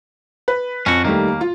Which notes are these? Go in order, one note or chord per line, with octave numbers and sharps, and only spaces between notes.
B4
F2 C#4 F#4
D#2 D#3 G3 A3 A#3
F4